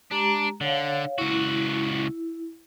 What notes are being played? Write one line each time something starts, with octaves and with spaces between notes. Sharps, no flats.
G#3 D4 G4 A#5
D3 C#5 F5
C#2 E4 F#4